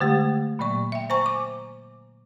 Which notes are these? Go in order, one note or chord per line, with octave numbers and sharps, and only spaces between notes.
D3 G#3 A3 G4
A#2 F#3 A#3 D5 C#6
E5 G5
C5 G#5 A#5 C#6
D6